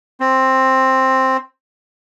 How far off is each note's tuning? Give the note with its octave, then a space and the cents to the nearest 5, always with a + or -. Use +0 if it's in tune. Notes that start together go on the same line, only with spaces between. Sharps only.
C4 +10